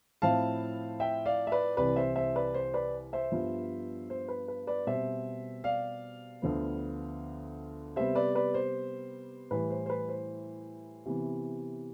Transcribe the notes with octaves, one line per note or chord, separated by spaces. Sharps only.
A2 F3 C4 E4 F5 A5
E5 G5
D5 F5
E5
B4 D5
C2 C3 E3 B4 D5
C5 E5
C5 E5
B4 D5
C5
B4 D5
C5 E5
G2 F3 B3 F4
C5
B4
B4
B4 D5
B2 G3 C4 C5 E5
D5 F5
D2 D3 F3 B3
C3 G3 B3 C5 E5
B4 D5
B4 D5
C5
A2 E3 G3 B4
C5
C5
B4
C5
C3 E3 B3